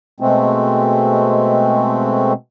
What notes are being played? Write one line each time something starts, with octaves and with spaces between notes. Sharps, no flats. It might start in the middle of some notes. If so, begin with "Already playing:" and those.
B2 G#3 A3 C4